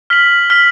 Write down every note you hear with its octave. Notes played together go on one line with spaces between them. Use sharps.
F6 B6 F#7
F6 B6 F#7